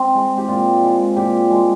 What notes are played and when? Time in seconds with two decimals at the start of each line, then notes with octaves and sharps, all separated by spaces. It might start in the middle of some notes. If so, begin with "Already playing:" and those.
Already playing: C4
0.14 G#3
0.38 G4
0.48 A#2 F4
0.82 G#3
1.16 A#2 G4
1.51 G#3